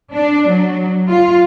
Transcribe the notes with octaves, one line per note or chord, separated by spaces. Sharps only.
D4
F#3
F4